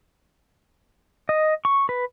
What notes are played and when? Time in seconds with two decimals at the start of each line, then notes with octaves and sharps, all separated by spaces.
1.29 D#5
1.65 C#6
1.89 B4